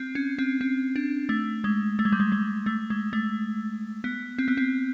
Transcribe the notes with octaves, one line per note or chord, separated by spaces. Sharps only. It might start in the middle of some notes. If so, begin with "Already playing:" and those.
Already playing: C4
C#4
C4
C4
D4
A3
G#3
A3
G#3
G3
G#3
G#3
A3
G#3
A3
B3
C4
B3
C4